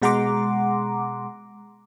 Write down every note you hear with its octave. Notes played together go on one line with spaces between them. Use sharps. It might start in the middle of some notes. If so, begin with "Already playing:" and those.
B2 G#3 F#5 A#5 C6 D6